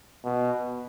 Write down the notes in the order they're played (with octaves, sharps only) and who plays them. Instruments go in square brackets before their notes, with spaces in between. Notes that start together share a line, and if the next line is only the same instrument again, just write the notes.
[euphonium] B2